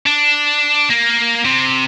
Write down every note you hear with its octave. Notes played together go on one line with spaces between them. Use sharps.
D4
A#3
C3